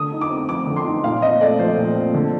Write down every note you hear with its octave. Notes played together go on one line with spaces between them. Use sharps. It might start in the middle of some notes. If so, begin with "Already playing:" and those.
Already playing: D3 D#6
D#4
D6
C4
F3 D6
D3
C6
D#4
A#2 F5
C4 D#5
A3 D5
F3 C5
A#2
C4
D3